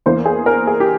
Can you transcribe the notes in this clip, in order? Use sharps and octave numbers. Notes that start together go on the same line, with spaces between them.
E2 E3 A#3 C5
G#4
A#4
G#4
G4